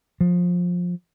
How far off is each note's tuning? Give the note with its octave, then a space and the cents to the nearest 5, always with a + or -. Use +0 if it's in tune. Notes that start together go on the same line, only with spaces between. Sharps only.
F3 +20